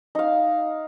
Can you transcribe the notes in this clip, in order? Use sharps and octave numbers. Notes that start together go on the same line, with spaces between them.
D#4 F5